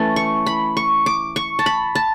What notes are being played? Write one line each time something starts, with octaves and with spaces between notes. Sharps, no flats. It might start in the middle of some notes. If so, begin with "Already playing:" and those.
Already playing: E3 A3 C#4 A5
C#6
B5
C#6
D6
C#6
A5
B5
A5